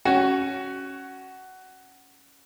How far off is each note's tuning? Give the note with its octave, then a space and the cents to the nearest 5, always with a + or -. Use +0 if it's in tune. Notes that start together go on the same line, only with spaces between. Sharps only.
C#4 +0 F#4 +15